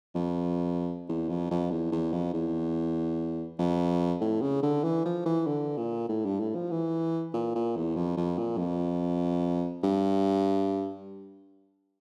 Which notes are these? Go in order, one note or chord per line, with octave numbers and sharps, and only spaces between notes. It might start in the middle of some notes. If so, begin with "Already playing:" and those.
F2
E2
F2
F2
E2
E2
F2
E2
F2
A2
C#3
D3
E3
F3
E3
D3
A#2
A2
G2
A2
F3
E3
A#2
A#2
E2
F2
F2
A#2
F2
G2